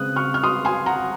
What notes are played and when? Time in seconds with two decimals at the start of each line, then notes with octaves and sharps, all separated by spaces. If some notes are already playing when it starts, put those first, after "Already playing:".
Already playing: C#3 G#3 C4 D#6 F#6
0.16 C#6 F6
0.34 F6
0.44 C6 D#6
0.65 G#5 C6
0.86 F#5 A#5